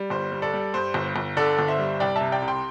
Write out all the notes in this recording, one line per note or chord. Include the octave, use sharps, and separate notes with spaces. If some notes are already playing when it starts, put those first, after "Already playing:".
Already playing: G3
G1 C5
G3
A4 D5
G3
G2 C5
G1
G1
D3 A4 D5
G1
C5 E5
G3
C2 D5 G5
E5 A5
C3
D5 G5
C2
G5 C6